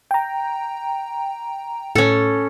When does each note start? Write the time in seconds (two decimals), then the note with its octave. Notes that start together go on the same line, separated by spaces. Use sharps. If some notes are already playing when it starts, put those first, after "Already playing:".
0.11 G5 A#5
1.95 A2 C#4 A4